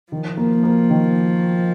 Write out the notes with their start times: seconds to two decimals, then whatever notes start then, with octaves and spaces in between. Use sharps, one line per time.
0.12 D#3 F3
0.37 A#3
0.64 A#3
0.90 D#3